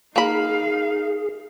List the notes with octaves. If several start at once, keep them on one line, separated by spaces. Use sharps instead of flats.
A#3 D#4 G#4 F5 B5